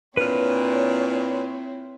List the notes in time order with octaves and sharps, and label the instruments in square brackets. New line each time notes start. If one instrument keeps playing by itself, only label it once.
[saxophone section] A#2 D4 [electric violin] C4 E4 [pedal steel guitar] B4 F6 [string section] C#5